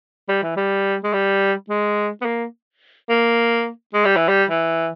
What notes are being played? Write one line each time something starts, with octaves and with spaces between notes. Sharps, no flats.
G3
E3
G3
G#3
G3
G#3
B3
A#3
A#3
G#3
G3
E3
G3
E3